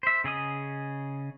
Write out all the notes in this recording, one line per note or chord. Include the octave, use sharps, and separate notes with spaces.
C5 E5
C#3 G#4 D#5 D#6